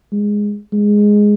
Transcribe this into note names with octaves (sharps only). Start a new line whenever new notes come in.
G#3
G#3